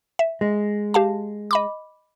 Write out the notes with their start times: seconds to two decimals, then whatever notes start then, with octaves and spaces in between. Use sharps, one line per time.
0.19 E5
0.41 G#3
0.94 G4 F5 A5
1.51 D#5 B5 D6